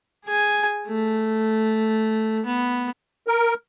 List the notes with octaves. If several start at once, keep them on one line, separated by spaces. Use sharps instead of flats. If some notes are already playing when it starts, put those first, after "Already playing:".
G#4 G#5
A3
B3
A#4